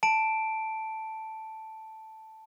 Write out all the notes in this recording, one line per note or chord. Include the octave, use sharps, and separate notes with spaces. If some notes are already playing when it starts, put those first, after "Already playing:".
A5 D7